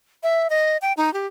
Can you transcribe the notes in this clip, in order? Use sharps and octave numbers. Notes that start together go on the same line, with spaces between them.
E5
D#5
G5
D#4
G4